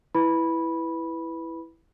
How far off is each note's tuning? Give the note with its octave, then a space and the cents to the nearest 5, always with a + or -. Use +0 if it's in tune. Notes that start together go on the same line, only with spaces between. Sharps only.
E4 +0 B4 +0 B5 -10